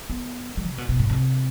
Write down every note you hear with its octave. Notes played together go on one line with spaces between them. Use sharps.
B3
G3
C3
B2
B2
G#2
C3